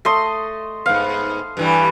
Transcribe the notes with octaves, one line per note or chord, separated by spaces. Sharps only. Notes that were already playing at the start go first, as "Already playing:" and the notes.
A3 D#5 C6
G#2 B3 F5
G2 E3 G3